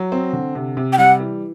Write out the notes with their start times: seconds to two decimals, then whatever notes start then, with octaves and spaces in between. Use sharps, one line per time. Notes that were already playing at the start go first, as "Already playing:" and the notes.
Already playing: F#3
0.12 C4
0.33 D3
0.55 C3
0.77 C3
0.92 G5
0.98 G3 F#5
1.20 E3